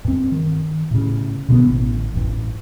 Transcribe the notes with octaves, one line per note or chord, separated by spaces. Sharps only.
G2 C4
D#3
A2 C#3
B2 D3 B3
A1
A1 G2